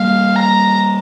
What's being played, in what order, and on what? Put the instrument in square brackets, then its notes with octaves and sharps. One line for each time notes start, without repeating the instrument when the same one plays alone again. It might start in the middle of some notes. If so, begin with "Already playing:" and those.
Already playing: [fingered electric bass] G3 A#3 [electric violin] F5
[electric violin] A#5